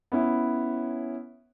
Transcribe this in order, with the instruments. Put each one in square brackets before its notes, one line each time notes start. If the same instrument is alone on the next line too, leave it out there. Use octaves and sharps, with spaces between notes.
[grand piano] B3 C#4 E4